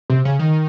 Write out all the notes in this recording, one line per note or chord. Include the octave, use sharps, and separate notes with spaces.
C3
C#3
D#3